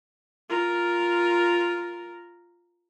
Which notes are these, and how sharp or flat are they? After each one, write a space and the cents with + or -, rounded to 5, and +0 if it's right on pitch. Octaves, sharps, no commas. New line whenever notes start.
F4 +0 A#4 +0